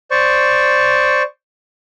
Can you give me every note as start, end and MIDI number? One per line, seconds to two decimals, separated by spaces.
0.11 1.23 72
0.11 1.23 74
0.11 1.23 85